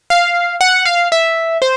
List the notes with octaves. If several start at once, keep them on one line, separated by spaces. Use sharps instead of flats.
F5
F#5
F5
E5
C5